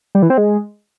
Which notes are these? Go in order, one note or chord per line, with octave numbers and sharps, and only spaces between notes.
G3
E3
C4
G#3